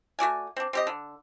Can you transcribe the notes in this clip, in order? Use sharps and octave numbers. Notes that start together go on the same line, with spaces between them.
A3 F#4 D5 G#5
C4 D4
C4 G4 D#5
D3